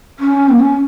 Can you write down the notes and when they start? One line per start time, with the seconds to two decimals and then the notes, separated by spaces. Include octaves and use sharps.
0.19 C#4
0.49 A#3
0.59 C#4